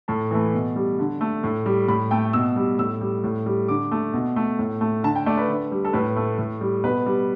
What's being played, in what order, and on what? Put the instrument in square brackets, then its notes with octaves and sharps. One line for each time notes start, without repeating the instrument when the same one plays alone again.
[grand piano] A2 A5
E3 A3
B2
G3
D3
A3
A2
G3
A2 B5
A3 G5
B2 E6
G3
A2 E6
G3
A2
G3
D3 D6
A3
B2
A3
A2
A3
D3 A5
G5
A3 D5
B4
D3
G3
A4
A2 B4
A3
A2
G3
B2 B4
G3